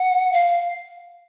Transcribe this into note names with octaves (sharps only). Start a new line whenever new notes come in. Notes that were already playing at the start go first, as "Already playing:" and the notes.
Already playing: F#5
F5